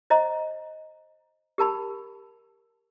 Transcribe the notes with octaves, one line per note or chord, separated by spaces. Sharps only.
C5 D#5 A#5
G4 A#4 A5 B5